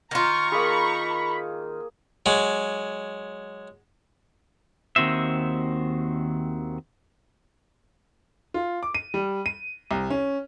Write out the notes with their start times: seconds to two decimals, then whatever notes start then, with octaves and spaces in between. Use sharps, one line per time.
0.11 D#3 F4 A#5 C#6
0.52 A#3 G#4 B5
2.26 F#3 G#3
4.96 D#2 D#3 C4 F#4 C5 E5
8.54 F4
8.83 D6
8.95 D#7
9.14 G3
9.46 D#7
9.91 C2
10.10 C#4